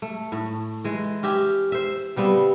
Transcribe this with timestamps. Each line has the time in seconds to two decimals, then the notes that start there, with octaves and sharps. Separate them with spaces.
0.02 A3
0.32 A2
0.84 E3 G#3
1.23 C#4 G4 E5
1.72 C5 E5
2.16 C#3 G3 B3 C4